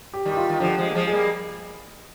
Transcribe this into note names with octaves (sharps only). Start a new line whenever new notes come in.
G4
D#3 G3
G4
F4
D#3
D3 F3 G4
F3 G#3
A#3
F3 G#3
G#4
G3 A#3